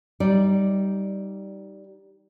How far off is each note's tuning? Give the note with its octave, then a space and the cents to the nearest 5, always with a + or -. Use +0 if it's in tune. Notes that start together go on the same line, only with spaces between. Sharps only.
G3 -10 D#4 +10 D5 +0